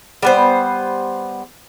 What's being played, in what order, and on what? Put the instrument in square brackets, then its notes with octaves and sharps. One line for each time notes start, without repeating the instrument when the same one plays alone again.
[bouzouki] G3 B3 C5